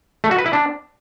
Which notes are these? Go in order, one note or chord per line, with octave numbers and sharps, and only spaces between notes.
A3
F#4
B4
E4
D4